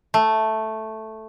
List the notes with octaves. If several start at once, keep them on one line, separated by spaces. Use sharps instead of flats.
A3